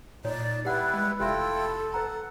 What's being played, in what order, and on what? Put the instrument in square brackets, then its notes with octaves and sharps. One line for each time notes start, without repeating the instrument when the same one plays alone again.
[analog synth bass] A#2 [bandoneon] D#4 [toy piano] C#5 [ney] D5
[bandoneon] G3 E4 [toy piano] G4 F#5 [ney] B4
[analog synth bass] G#3
[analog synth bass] F1 [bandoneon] E4 F4 G5 [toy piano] G4 E5 [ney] A4
[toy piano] B4 A#5 [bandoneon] F#5